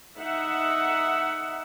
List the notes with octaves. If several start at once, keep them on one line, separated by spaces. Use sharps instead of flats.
D#4 E5 F#5